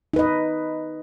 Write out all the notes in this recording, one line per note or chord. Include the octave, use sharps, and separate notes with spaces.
D#4 B4 D#5